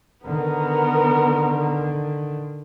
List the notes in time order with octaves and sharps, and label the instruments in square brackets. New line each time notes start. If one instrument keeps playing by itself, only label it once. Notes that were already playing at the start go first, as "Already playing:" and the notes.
[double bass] D3 D#3 [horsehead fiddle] B3 A#4